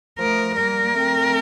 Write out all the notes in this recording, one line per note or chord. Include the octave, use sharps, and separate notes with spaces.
F3 A3 A#4
G3 A#3 A#4
A#3
A3 C4